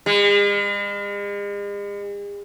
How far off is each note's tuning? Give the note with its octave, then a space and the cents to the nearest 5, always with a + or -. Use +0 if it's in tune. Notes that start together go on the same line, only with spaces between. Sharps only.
G#3 -45